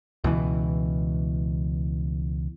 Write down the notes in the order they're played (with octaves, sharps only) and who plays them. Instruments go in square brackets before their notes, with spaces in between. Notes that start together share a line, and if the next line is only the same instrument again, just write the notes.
[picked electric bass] C#2 B2 E3